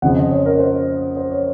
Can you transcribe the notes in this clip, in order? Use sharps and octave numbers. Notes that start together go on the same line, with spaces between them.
F2 C#3 F3 F#5
D#5
C#5
A#4
C5
C5
C#5